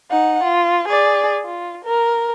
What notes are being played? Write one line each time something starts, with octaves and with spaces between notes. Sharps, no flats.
D#4 F#5
F4
G#4 D5
F4
A#4